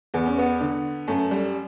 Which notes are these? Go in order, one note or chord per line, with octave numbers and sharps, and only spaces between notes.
E2 B3
C#4
B3
D3
F#2 A3
G3